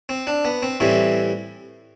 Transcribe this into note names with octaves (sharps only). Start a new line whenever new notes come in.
C4
D4
B3
C4
A2 E3 G3 C4